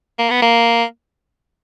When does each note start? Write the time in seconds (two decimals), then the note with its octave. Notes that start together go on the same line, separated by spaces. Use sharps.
0.19 A#3
0.30 B3
0.42 A#3